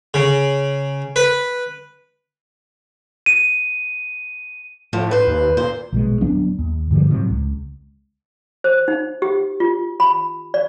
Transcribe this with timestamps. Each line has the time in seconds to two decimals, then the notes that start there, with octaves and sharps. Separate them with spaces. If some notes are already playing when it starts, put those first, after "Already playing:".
0.14 C#3
1.16 B4
3.26 D#7
4.93 A2 F3
5.11 B4 C5
5.27 D#2
5.57 A#2 C5
5.92 A#1 B2 G#3
6.21 D1 F#3 B3 D4
6.58 D#2
6.91 G2 D3 F3 G3
7.09 A2 C3 F#3
7.30 C#2
8.64 C5
8.88 D#4
9.22 G4
9.60 F4
10.00 B5
10.54 D5